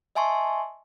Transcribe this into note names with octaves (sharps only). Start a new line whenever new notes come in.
D#5 E5 G#5 A5 C6 C#6